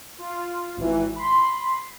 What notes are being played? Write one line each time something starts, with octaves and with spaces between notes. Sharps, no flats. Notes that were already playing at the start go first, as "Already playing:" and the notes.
F4
G#1 E3
B5 C6